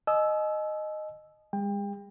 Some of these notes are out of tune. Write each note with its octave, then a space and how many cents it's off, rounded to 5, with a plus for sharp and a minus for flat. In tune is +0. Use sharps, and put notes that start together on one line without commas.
D#5 -10 G#5 +40 E6 +0
G#3 -40 G5 +30